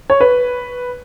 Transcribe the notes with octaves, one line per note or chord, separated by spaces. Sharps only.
C#5
B4